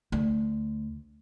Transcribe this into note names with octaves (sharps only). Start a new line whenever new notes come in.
D2